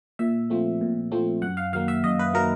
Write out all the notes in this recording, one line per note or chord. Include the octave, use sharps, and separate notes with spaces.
A#2 E5
F3 A3 C4
A#2
F3 A3 C4
F#2 F#5
F5
D#3 F#3 A#3 F5
E5
F#2 D#5
B4
D#3 F#3 A#3 A#4